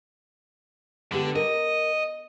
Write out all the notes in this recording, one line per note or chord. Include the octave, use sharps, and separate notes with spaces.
D3 G#3 B3 G4
A#4 D#5